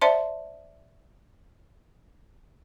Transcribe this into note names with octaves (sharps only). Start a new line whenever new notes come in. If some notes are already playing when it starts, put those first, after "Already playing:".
C5 D5 E5 A5 C6